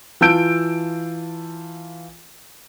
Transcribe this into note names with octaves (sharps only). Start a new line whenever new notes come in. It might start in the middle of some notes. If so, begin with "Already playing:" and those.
E3 F4 A5 E6 G6 D7